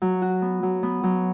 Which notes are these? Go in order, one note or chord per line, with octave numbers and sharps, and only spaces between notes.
F#3
F#4
B3
F#3
B3
F#3